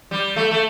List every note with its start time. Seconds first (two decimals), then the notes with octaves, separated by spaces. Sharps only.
0.11 G3
0.36 A3
0.51 A3